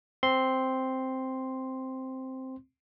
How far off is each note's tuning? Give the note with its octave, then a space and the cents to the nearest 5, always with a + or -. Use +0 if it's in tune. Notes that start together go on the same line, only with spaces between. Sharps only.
C4 +0 C6 +0